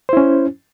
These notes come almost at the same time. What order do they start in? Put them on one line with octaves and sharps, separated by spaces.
C5 E4 C#4